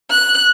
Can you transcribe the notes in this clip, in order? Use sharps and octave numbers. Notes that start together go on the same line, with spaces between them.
F#6